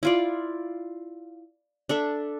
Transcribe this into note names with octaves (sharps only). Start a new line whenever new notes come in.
E4 F4 D5
D4 A4 E5